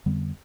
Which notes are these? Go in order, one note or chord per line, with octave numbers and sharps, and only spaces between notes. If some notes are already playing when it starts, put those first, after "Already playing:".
F2 D3 G3 B3